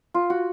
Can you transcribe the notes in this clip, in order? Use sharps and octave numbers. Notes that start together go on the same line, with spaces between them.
F4
F#4